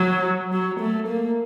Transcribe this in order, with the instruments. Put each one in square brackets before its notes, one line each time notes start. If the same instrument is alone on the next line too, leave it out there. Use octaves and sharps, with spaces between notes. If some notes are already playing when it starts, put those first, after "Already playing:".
Already playing: [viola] F#3
F#3
A3
A#3